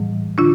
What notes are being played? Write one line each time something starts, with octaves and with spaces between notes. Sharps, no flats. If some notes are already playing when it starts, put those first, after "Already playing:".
Already playing: A2 E3 G3
D3 D4 F4